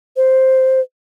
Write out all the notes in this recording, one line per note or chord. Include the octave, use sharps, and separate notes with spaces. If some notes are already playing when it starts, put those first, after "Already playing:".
C5